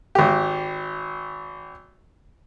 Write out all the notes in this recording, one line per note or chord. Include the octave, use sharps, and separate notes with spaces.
G#1 G4